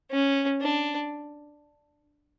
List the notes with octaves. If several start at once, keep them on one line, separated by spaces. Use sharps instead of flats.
C#4
D4